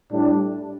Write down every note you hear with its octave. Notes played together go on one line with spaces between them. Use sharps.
A2 G3 D4